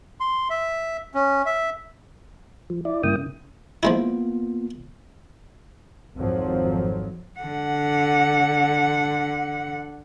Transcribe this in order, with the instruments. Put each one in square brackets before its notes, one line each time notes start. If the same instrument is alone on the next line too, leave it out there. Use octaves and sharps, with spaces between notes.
[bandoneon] C6
E5
C#4
E5
[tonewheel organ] F3
E4 D5
G2 C#3 A#3 E4 G5 D#6
C#3
[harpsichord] F3 G#3 E4 [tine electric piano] A#3 B3 F4
[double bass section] G#1 F2 F3 F#3
[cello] D3 F#5